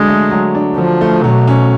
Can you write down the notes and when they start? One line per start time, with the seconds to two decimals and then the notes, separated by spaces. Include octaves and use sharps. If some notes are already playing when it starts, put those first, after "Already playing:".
Already playing: D3 F#3 G#3 D4
0.08 A3
0.31 F#3
0.55 D4
0.77 D3 F3
1.01 A3
1.24 B2 F#3
1.47 C#4